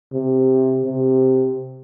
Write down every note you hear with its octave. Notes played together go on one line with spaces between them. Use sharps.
C3
C3